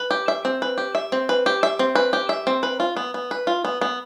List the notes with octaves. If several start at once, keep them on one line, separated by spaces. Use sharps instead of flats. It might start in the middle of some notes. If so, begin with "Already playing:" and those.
Already playing: B4
G4
E5
C4
B4
G4
E5
C4
B4
G4
E5
C4
B4
G4
E5
C4
B4
F4
B3
B3
B4
F4
B3
B3